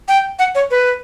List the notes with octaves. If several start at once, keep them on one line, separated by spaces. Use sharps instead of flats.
G5
F#5
C#5
B4